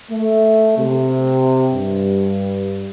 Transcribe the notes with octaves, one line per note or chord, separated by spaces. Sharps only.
A3
C3
G2